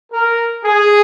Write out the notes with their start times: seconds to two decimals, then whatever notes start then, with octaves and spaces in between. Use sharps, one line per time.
0.12 A#4
0.65 G#4